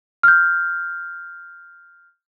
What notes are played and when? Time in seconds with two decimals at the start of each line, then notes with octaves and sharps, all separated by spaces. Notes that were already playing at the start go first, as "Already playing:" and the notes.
0.23 F6 G6